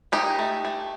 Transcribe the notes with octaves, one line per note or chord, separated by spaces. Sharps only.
D#3 D#4 G4
A3
A3